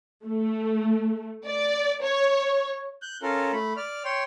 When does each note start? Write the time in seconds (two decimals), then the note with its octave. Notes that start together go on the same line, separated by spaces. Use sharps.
0.26 A3
1.47 D5
2.03 C#5
3.02 F#6 G6
3.23 C#4 F4 A4 A#4
3.53 A3 B5
3.77 D5 F6
4.05 C#5 G5 C6